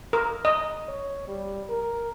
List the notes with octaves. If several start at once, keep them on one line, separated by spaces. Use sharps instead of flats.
A#4
D#5
C#5
G3
A#4